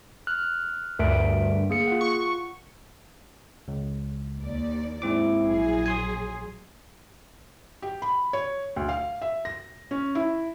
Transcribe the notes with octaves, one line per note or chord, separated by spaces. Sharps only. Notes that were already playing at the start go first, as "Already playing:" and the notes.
F6 F#6
D2 G2 A#4 E5 D7
A#3 G#4 C#7
F4 F#5
C#6
C#2
D#2 D5
G#2 C4 E4 D6
A#1 F#3 G#4
G#5 C6 D#6
G4
B5
C#5
D2
F5
E5
A#6
C#4
E4